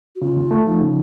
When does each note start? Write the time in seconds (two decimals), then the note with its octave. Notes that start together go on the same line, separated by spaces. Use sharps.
0.16 F#4
0.22 C#3 F4
0.37 D#2
0.51 A3
0.66 F3 D#4
0.81 C#3